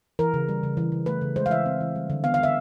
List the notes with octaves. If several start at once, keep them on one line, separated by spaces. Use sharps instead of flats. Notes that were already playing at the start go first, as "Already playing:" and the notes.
E3 A#4
C#3
G3
C#3
E3
C#3
A3 B4
C#3
G#3 C5
F5
E3 E5
C4
E3
G3
D3
B3 F5
F5
D3 E5